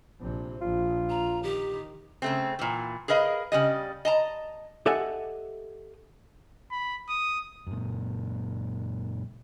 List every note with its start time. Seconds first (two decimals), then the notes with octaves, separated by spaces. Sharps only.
0.20 A#1 C3
0.61 A#1 F4
1.10 A#5
1.43 D#3 G4
2.22 C#3 A3 C4
2.59 A#2 E3
3.08 G#4 A#4 B4 D#5 F5
3.52 C#3 G3 D#5
4.05 D#5 A5 A#5
4.86 G4 A4 D#5 E5 F#5 G#5
6.71 B5
7.09 D#6
7.67 F#2 A#2